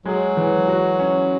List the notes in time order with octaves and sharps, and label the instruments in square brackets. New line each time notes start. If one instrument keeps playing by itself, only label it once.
[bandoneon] F#3 [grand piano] G#3
[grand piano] E3
F#4
C#4